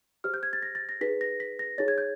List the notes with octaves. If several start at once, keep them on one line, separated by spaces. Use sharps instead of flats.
G4 C5 F6
G6
G#6
A6
A#6
A6
A#6
D#4 G#4 B4 B6
A#6
B6
A#6
D#4 G#4 C#5 A6
G#6
G6